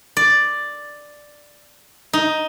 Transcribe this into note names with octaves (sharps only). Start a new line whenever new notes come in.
D5
D#4